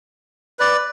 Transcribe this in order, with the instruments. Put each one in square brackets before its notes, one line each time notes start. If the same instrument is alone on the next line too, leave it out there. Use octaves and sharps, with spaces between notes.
[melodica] B4 D5